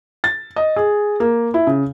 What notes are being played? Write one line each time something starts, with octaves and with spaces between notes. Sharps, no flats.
A6
D#5
G#4
A#3
E4
C#3